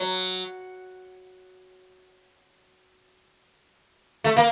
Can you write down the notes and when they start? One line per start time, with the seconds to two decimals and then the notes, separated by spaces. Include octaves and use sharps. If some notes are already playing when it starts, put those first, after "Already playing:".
Already playing: F#3
4.24 A3
4.37 A#3